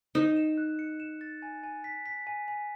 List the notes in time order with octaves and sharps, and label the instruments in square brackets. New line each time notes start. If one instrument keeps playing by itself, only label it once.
[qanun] D#4 [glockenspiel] E7
[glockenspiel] E7
F#6
C#7
E7
A6
G#5
G#5
B6
B6
G#5
G#5